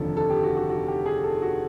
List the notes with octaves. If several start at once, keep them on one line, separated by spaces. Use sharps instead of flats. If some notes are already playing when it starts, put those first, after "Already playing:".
Already playing: F1 D#2 D3 F3 A4
A4
G4
F#4
F#4
F#4
G4
G#4
A4
F#4